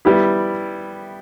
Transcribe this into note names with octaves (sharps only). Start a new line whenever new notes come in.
G3 B3 E4 G4